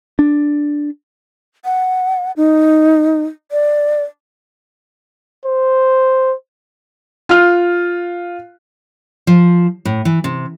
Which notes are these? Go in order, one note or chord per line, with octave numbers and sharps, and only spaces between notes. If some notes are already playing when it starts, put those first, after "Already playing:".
D4
F#5
D#4
D5
C5
F4 F6
F3
A2
E3
C3